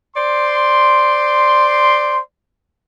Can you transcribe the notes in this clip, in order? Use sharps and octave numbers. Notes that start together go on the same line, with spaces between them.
C5 D5 C6